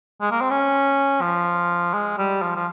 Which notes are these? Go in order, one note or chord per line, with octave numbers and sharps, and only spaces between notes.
G#3
A#3
C4
C#4
F3
G#3
G3
F3
F3